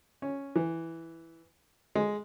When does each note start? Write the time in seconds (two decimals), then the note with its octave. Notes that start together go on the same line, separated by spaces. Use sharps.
0.22 C#4
0.56 E3
1.95 G#3